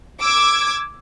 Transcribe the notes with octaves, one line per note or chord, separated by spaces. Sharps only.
D6 E6 G#6